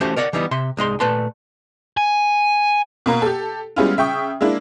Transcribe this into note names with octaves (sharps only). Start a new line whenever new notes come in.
E3 A3 C#4 F#4 G4 C5
A#4 C#5 D5 F#5
E3 G3 B3 D#4 E4
C3 E5 C6
C2 G#3 D#4 C6
A#2 A3 B4 A5 C6
G#5
B2 A#3 A#5
G4 A4
G3 G#3 B3 C#4 E4 F4
C#3 E5 G5 C#6 D#6
G#3 A#3 D4 E4